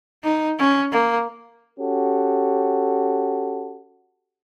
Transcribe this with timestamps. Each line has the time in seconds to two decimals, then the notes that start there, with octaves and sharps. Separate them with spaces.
0.23 D#4
0.59 C#4
0.92 A#3
1.79 C#4 F#4 G4 A4